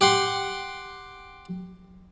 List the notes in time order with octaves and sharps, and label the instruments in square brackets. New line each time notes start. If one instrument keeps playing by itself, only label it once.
[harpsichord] G4 F#5 C6